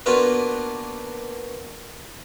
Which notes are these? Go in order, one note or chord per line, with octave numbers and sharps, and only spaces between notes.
A#3 B3 D4 F4 F#4 B4